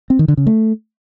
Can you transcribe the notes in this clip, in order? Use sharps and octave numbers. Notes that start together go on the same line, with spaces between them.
C4
D#3
D3
C#3
A3